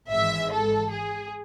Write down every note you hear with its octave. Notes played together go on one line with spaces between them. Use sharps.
G#1 G#2 E3 G#3 E5
A4
G#4